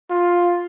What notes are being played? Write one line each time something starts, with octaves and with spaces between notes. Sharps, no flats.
F4